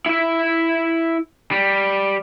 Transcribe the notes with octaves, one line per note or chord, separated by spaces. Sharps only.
E4 E5
G3